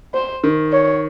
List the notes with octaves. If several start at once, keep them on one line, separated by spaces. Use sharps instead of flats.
C5
D#3
C#5